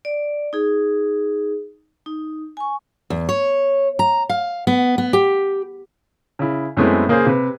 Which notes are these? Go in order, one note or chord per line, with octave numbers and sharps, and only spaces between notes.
D5
D#4 G#4
D#4
G#5 C#6
E2
C#5
A#5
F5
B3
B3
G4
C#3 E4
F#2 G#3 A3 B3 C4 E4
C#3 A#3 G#4 A#4 C5
C3 B4